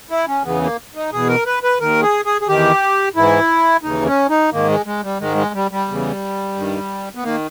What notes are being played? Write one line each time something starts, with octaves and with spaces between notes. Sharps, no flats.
E4
C#4
E2 C#3 E3 B3
A#3
D#4
E2 B2 G#4
A#4
B4
B4
D#2 D#3 A#4
G#4
G#4
G#4
E2 D#3 G4
G#2 E3 E4
D#2 C#3 E3 D#4
C#4
D#4
G#2 D#3 A#3
G#3
G#3
G3
G#2 D#3 G#3
G#3
G3
G3
E2 C#3 E3
G2 D#3
B3
D#3 A#3